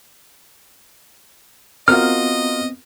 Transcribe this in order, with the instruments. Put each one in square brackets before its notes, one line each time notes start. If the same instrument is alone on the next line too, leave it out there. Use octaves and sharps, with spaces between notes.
[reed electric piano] B3 C4 [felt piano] F4 F#4 A#4 [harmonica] D#5 [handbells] F6